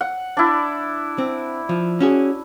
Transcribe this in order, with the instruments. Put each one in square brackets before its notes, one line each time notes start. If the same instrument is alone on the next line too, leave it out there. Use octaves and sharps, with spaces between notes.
[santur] F#5
D4 E4
[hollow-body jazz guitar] C4
F3
C#4 F#4 G#4